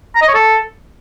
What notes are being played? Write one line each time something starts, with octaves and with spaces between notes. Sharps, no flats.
A#5
D#5
C#5
A4